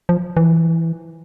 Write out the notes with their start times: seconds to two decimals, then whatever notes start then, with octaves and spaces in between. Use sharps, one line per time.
0.09 F3
0.37 E3